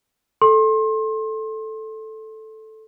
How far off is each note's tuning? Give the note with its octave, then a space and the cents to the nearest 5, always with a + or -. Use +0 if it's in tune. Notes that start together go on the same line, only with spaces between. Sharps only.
A4 -5 C6 +30